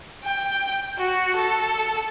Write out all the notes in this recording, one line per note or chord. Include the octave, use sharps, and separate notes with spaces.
G5
F#4
A4